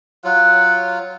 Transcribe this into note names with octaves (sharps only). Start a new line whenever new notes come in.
F#3 F4 F#5